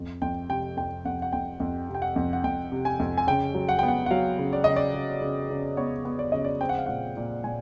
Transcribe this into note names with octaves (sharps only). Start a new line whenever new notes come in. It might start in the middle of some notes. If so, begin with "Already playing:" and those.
Already playing: F2
F2 G5
C3 G5
F2 G5
F2 F#5
F#5
F2 G5
F2
C3
G5
F#5
F2
F#5
F2 G5
C3
G#5
F2
G#5
C#3 G5
F#3
F#5
B3 G5
F#5
F#5
F#3 F5
C#3
D5
C#3 D#5
D5
C#3
C#3
C#3
B3 C#5
B3
D5
C#3 D#5
D5
C4 G5
F#5
F5
A#2 F#5
A#2
A#2 G#5